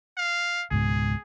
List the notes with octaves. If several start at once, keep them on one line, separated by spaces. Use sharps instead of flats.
F5
C#2 G#2 B2 G#4